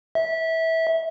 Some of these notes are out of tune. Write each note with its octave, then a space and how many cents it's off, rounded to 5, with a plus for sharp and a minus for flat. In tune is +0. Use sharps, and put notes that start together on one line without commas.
E5 -20